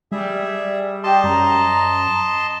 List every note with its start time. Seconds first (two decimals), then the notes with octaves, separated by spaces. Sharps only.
0.12 G3 G#4 E5
1.04 G4 D#5 A5 C6
1.24 F#2 A#5